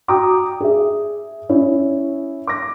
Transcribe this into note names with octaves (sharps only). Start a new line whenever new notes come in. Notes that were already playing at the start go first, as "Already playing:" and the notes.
F#4 G5 A#5 D6 D#6
G#4 E5
C#4 E4 C#5
D6 A#6